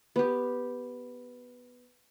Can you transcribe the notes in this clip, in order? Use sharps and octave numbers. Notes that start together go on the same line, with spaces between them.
B3 G4